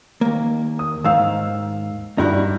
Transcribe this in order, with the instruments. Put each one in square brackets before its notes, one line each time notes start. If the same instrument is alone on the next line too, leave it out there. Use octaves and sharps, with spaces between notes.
[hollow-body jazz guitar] D#2 A#3
[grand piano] D#6
[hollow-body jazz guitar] D#2 G#2 D#3 [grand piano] F5 E6
[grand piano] G2 G3 D5 [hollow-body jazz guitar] D#4 E4 F#4